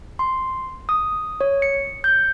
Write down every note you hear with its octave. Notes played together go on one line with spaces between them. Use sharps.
C6
D#6
C#5
C#7
G6